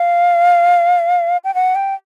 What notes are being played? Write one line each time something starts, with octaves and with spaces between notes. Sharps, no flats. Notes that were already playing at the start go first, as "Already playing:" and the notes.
Already playing: F5
G5
F#5
G5